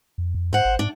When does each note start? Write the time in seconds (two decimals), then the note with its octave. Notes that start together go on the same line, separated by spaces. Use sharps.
0.18 F2
0.35 F2
0.53 G#2 C5 F#5
0.65 G#1
0.79 G#2 D4